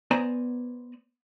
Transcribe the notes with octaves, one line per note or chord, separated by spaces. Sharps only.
B3 C5 D5 G#5 A#5